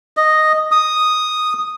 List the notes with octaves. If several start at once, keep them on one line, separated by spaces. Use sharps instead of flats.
D#5
D#6